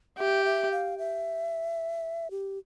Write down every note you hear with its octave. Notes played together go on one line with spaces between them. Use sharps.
G4 E5
E5
F5
E5
G4